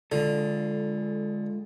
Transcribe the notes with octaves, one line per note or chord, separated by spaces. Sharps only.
D3 G#3 F4 A4